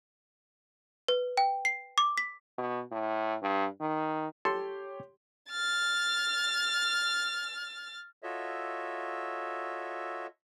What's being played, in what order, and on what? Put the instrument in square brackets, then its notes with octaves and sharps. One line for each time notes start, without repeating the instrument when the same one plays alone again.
[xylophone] B4
G5
C7
D6
B6
[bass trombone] B2
A2
G2
D#3
[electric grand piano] G4 C#5 [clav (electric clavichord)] A4 [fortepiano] C6
[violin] F6 A6
[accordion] F4 F#4 A4 C#5 D#5 E5